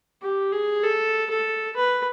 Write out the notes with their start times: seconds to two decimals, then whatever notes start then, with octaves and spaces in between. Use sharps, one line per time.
0.22 G4
0.52 G#4
0.83 A4
1.30 A4
1.76 B4